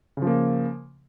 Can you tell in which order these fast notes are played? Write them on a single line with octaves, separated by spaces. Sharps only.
C#3 F3 A#3